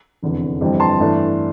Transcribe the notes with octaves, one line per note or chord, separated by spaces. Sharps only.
F1 E2 D3
G1 F2 E3 G3 C4
A5 C6
G2 E3 A3 D4